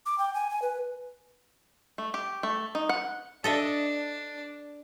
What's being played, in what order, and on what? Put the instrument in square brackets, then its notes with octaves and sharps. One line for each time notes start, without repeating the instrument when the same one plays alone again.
[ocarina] D6
G5
G#5
G#5
B4
[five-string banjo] A3
G4
A3
D#4
F#5
[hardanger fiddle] D4 [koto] A4 D#5 E5